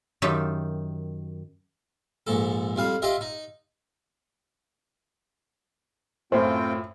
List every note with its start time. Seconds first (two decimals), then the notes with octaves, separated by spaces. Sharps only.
0.22 F#2 D#3 D#4 F4 G4 E5
2.27 A#1 G#2 A4
2.76 F2 G3 F5
3.02 F4 G4 D#5 E5
3.21 D#4
6.32 F#2 A2 C4 F4 C5 G5